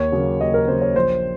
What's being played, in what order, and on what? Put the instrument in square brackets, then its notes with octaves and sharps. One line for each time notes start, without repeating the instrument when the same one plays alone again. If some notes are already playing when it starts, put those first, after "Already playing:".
Already playing: [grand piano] D#2 C#5
C#3 F#3 A#3
D#2 D#5
A#4
C#3 F#3 A#3 C5
C#5
A#1 C5